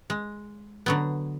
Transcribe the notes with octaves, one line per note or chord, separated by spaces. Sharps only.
G#3
D3 F#3 B3